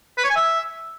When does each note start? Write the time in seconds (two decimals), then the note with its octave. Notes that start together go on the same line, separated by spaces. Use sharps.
0.18 B4
0.24 C#5
0.30 G#5
0.36 E5